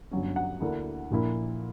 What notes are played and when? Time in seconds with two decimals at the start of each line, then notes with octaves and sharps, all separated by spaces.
0.11 G1 G2 F#3 C#4
0.36 F#5
0.60 D2 D3 A#3 E4
1.11 A#1 A#2 A#3 E4